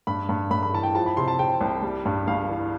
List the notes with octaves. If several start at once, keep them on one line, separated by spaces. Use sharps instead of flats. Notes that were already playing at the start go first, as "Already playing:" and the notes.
G2 B5
G2
G2 B5
B5
E3 A5
G5
F3 A5
B5
C3 C6
A5
C3 G5
C2
G3
G2
G1 F5
E3